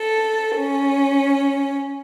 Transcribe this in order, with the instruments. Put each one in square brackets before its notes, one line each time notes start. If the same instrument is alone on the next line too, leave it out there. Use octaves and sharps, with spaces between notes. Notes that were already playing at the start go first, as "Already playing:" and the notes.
Already playing: [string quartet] A4
C#4